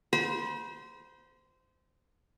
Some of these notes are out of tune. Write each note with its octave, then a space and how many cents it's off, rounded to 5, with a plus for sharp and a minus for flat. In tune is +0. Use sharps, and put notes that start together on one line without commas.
C5 -20 B5 -45